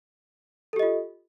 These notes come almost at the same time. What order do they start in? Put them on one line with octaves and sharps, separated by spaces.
A4 G4 D#5 F4